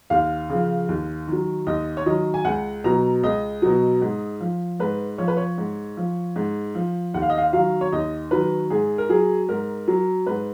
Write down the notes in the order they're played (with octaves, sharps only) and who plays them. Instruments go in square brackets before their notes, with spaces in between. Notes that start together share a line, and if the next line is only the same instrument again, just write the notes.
[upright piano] D#2 F5
C#3 F3
D#2
D#3 F#3
D#2 D#5
C#5
D#3 F#3 D#5
G#5
C#2 F#5
B2 F#3 A#5
C#2 D#5
B2 F#3
G#2
F3
G#2 B4
F3 C#5
B4
C#5
G#2
F3
G#2
F3
D#2 F#5
F5
D#5
F5
D#3 F#3 F5
C#5
D#2 D#5
D#3 F#3 B4
G#2 G#4
A#4
F#3 G#4
G#2 A#4
F#3
G#2 B4